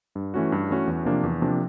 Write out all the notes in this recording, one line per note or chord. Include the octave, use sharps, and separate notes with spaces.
G2
E3 A3 C#4 F#4
G2
E3 A3 C#4 F#4
E2
C3 F3 A#3 D4
E2
C3 F3 A#3 D4